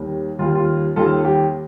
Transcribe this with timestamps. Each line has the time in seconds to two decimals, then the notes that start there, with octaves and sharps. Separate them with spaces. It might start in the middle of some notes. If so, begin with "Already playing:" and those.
Already playing: D#2 D#3 G3
0.39 D#2 D#3 G3 F4
0.55 F4
0.96 D#2 D#3 G3 F4 A4
1.25 G4